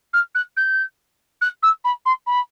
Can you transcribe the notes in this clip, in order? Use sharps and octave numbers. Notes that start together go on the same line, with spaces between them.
F6
F#6
G6
F#6
E6
B5
C6
B5